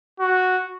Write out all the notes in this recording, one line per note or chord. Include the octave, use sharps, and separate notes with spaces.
F#4